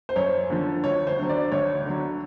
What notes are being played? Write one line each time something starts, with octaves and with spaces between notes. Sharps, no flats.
C5
F#2 C#5
D3 F3
D2 C#5
C5
D3 F#3
D5
D2 C#5
D3 F#3